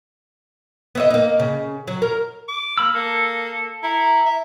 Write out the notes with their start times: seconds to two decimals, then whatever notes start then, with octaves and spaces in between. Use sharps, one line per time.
0.95 B3 E4 D#5
1.10 A#3 D#4
1.40 C#3
1.87 F#3
2.02 A#4
2.48 D6
2.78 A#3 B5 E6
2.95 A#3 A4
3.83 E4 A#5
4.26 E5